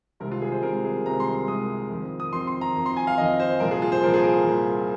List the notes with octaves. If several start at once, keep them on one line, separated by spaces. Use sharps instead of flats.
C2 C3 D#3 G#3 C4 A#4
F4
G#4
C5
C2 C3 D#3 G#3 C4 A#4
G#4
C2 C3 D#3 G#3 C4 A#5
C6
C6
C2 C3 D#3 G#3 C4 D#6
F2 D#3 C4
D#6
F2 D#3 C4 C6
C6
A#5
F2 D#3 C4
C6
G#5
F5
F2 D#3 C4 D#5
C5
C2 A#2 F3 A#4
G#4
F4
C5
C2 A#2 F3 A#4
G#4
A#4
C2 A#2 F3